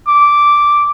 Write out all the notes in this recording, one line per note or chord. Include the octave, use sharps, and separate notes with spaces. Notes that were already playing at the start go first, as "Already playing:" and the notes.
D6